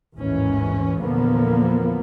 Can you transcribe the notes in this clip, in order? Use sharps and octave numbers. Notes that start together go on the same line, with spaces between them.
A1 D#2 G#2 E3 C#4
E2 A#2 D3 F3 A#3 B3